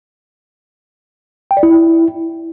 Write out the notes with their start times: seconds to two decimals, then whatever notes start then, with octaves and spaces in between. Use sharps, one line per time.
1.51 G5
1.57 D5
1.63 E4